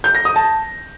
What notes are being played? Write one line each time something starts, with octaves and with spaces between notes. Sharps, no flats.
G6
A#6
D#6
A5